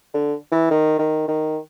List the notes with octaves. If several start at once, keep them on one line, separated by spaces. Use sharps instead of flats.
D3
E3
D#3
D#3
D#3